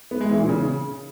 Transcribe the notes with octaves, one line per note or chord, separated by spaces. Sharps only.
B3
G#3
E3
A#2
C#3